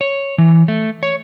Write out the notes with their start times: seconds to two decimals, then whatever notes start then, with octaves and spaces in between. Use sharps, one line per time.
0.01 C#5
0.38 E3
0.68 A3
1.03 C#5